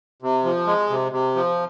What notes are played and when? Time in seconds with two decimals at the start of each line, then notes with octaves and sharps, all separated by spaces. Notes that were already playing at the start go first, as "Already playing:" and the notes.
0.22 C3
0.45 F3
0.67 G#3
0.90 C3
1.12 C3
1.36 F3